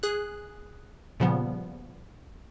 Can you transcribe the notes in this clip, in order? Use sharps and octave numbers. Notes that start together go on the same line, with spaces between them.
G#4 F#6
A#2 C#3 F3 G3 B3